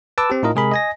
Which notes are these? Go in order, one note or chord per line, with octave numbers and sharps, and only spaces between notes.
B4 A5 D6 E6
C4 G4
A2 D#4 F4 A#4 D#5
C3 G#3 G#4 A#4 B5
D#5 G#5 A#6